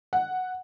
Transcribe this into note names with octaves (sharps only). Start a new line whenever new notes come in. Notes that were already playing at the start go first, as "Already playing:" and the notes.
F#5